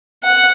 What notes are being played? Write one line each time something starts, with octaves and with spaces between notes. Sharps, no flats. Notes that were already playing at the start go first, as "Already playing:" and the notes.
F#5